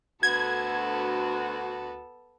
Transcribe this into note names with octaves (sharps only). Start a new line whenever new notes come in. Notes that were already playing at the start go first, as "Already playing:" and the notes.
D2 B3 F#4 A4 G#6